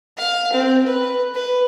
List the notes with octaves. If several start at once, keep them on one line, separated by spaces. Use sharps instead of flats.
F5
C4
B4
B4